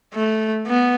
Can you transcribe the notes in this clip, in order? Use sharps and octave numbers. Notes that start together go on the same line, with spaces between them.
A3
B3